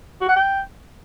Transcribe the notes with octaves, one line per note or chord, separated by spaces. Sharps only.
F#4
F#5
G5